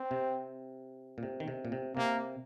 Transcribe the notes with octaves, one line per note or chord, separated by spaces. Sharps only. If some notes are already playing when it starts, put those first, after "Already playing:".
Already playing: C4
C3
A#2
C3
D#3
C3
A#2
C3
C3 A#3